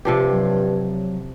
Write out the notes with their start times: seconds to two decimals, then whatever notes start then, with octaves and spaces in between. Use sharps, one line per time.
0.05 G2 C3 F3 G4
0.31 F#3